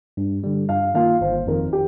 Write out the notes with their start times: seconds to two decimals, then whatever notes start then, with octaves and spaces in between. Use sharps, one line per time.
0.17 G2
0.44 D3 G3
0.69 G2 F5
0.94 D#3 A#3 F4 F5
1.21 G1 C5
1.47 F2 D#3 A#4
1.73 G4